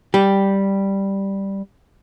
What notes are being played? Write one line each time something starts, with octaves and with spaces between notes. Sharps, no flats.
G3 G4